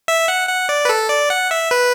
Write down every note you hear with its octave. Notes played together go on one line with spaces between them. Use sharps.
E5
F#5
F#5
D5
B4
A4
D5
F#5
E5
B4